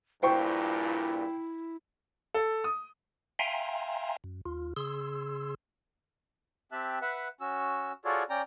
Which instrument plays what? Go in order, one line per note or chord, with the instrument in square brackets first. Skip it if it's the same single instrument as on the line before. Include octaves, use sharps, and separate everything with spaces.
[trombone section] A#1 G2 A#2 [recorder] E4 [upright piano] C5 G5 C#6
[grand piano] A4
D#6
[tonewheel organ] E5 F5 G5 G#5 A#5 C6
F#2
D#2 F4
C#3 G#4 C6 E6
[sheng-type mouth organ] C4 G4 E5 A5 F#6
B4 E5 F#5
C#4 F#4 E6
F4 F#4 G#4 A4 C#5 D5
C#4 D5 G5 A#5